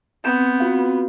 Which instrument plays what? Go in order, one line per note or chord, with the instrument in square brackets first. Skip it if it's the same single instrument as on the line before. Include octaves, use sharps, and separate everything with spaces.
[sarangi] B3 [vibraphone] C4 [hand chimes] G6
[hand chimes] F4 F#4 F5